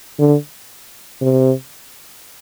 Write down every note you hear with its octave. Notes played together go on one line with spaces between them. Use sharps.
D3
C3